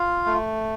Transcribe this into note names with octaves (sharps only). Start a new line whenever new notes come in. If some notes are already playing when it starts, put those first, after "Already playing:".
Already playing: F4 F5
A3